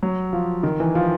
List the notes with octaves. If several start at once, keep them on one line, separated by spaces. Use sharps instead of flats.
F#3
F3
D#3
E3
F3